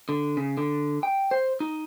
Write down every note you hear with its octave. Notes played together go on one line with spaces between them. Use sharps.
D3
C#3
D3
G5
C5
D#4